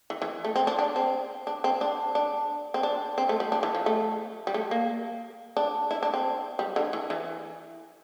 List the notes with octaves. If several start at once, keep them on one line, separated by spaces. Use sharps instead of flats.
E3
E3
A3
C4
D4
D4
C4
D4
C4
D4
D4
C4
D4
C4
A3
G3
D4
E3
F3
A3
G3
A3
A#3
D4
E4
D4
C4
G3
D3
E3
E3